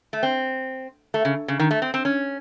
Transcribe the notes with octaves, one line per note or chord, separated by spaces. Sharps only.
A3
C4
A3
C#3
C#3
D#3
A3
C4
C4
C#4